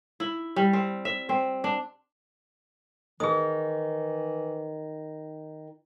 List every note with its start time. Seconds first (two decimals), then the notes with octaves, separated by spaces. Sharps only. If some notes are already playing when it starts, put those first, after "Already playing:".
0.20 E4
0.56 G3
0.73 C4
1.05 E5
1.29 C4
1.64 D4
3.20 D#3 E3 G#4 D#6